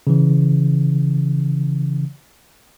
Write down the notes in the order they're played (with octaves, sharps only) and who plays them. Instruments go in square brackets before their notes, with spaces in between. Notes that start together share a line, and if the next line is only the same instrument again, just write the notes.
[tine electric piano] C#3 E3